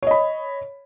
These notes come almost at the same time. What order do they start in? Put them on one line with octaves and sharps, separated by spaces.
C#5 D#5 B5